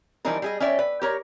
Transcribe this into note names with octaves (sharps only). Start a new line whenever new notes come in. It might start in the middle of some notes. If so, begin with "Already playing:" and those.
E3 F3 G3 D4 D#4 A#4
G3 G#4 D#5
C#4 C#5 D5 E5 F5 G5
B4
G4 A#4 C#5